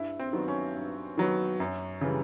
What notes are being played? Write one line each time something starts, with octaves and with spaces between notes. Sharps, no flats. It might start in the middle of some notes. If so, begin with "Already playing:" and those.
Already playing: G2 E4
C4
D#3 F#3 B3
C#4
G2
D#3 F#3 B3
F#2
C#3 E3 G3